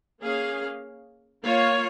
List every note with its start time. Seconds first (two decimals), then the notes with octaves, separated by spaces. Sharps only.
0.22 A#3 C#4 G#4 F5
1.44 A#3 F4 C#5 F5